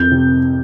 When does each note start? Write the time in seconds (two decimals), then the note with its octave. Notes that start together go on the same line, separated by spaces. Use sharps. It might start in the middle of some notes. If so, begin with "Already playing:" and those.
Already playing: F2 G6
0.11 C3